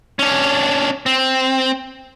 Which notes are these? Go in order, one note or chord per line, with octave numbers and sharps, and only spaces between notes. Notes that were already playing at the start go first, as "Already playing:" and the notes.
C#4 D4
C4